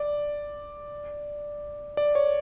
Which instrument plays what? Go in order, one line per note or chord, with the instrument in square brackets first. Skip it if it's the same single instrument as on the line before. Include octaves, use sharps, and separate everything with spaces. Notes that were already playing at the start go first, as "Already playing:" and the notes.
Already playing: [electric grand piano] D5
D5
C#5